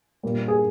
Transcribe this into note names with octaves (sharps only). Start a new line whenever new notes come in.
A#2 G3 A#3
G#4